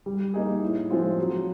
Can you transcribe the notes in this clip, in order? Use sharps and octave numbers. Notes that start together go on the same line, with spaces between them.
G3
A#3 D#4 G#4
A2
F3 G#3 C4 F4
F#3